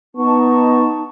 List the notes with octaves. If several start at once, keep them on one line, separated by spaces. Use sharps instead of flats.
B3 D#4 A5 C#6